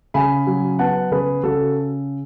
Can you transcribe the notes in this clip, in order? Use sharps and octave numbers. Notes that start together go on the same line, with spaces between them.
C#3 G#5 B5
F#3
B3 F#5 A5
C#3 G#4 B4
C#3 F#4 A4